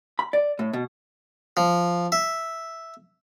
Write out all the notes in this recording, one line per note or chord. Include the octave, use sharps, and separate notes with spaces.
B5
D5
A2
B2
F3
E5